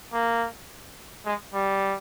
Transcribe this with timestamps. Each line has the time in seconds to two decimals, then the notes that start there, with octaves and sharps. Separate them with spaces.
0.13 A#3
1.26 G#3
1.54 G3